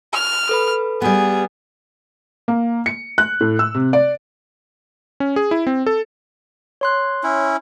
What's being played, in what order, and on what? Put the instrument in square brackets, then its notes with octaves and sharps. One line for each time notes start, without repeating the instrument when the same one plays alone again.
[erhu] F6
[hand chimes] A4 B4 B5
[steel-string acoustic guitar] G3 B3 [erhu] G#4
[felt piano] A#3
C#7
F#6
A2
E6
C3
D5
[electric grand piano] C#4
G#4
E4
C4
A4
[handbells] C#5 C6 F#6
[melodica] C#4 E4